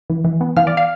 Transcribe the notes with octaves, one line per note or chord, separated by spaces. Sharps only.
E3
E3
B3
E3 F5 F6
D5 D6
F5 F6